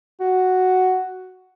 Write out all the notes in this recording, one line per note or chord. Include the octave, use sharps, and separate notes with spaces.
F#4